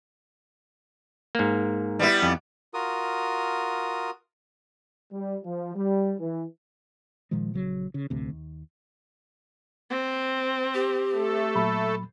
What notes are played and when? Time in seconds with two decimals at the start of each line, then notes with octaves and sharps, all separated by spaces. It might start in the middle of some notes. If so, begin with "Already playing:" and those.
1.35 G#2 A#3
1.99 G3 B3 E4
2.22 F2
2.74 F4 F#4 A#4 D#6
5.13 G3
5.44 F3
5.75 G3
6.20 E3
7.31 A#2 D#3 F3 G#3
7.54 A#1 C#3 F#3
7.94 C#3
8.10 D1 A1 D2 C3
8.29 D#2
9.90 C4
10.74 G4
11.13 A3 A4
11.56 A#2 F#3 B5